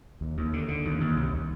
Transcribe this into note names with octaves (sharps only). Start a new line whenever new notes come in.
D#2
D#2
D3
D3
D#2
D#2
C2